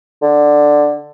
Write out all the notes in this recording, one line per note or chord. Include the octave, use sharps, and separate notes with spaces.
D3